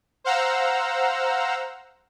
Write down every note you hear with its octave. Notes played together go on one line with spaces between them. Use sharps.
C5 F5 F#5 A#5 E6